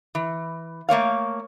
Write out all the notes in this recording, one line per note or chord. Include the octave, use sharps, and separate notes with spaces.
E3
A3 A#3 C#5 F5